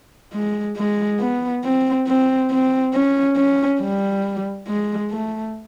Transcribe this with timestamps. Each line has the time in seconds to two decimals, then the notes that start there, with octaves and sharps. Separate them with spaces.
0.34 G#3
0.77 G#3
1.20 B3
1.64 C4
2.07 C4
2.50 C4
2.93 C#4
3.36 C#4
3.80 G3
4.67 G#3
5.11 A3